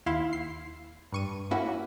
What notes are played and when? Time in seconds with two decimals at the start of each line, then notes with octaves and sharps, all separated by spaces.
0.06 D#2 E4 F5 C6
0.33 C7
1.12 G2 C#6 D#7
1.51 A#3 C#4 E4 F#4